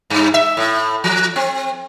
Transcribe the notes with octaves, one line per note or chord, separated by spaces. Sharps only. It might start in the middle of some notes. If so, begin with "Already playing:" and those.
G2
E5
A2
F3
C4